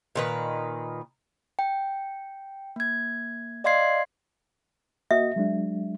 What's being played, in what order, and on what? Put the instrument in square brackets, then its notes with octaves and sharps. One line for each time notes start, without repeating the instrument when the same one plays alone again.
[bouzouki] A#2 D#3 B4
[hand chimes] G5
A#3 G#6
D5 D#5 F5 C6 G#6 C7
[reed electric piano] A#3 F#4 D#5 [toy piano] E5
[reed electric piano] F#3 G#3 D4